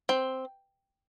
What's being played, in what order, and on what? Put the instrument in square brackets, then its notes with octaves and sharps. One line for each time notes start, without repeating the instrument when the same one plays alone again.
[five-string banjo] C4